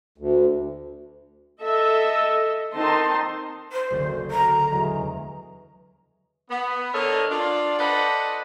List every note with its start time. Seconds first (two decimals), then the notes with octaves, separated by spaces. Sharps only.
0.18 D2
1.61 A4 D#5 E5
2.74 D#3 C4 D#4 D#5 A5 C6
3.72 C5
3.91 F#1 D2 D3
4.31 A#5
4.71 E2 F#3 G#3
6.50 B3
6.94 D3 A4 A#4 C#5 D#5
7.30 D4 F4
7.79 A4 B4 C5 D5 D#5 F#5